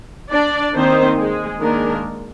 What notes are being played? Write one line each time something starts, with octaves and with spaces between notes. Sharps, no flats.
D4 D5
D#3 A#3 C4 D#4 C5
G#3 G#4
D#3 G#3 A#3 D4 A#4